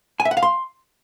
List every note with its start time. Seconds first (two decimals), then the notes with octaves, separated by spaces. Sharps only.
0.20 G#5
0.25 E5
0.31 F#5
0.37 F5
0.43 C6